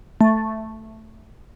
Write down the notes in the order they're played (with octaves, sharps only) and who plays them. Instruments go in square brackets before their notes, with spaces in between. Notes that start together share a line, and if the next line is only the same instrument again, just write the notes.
[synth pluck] A3